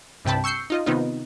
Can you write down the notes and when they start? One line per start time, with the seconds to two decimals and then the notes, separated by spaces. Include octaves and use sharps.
0.25 C2 G2 C3 G5 A5 B5
0.44 C#6 E6 G6 C7 C#7
0.70 D#4 F4 D#5
0.86 C3 D#3 B3 D#4 F4